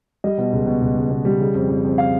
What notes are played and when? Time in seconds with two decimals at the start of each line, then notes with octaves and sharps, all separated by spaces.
0.24 G3 D#5
0.38 B2
0.53 C#2
0.67 B2
0.82 C#2
0.97 C#2
1.10 B2
1.25 G3
1.40 C#3
1.55 F2
1.70 F2
1.84 F2
1.98 F5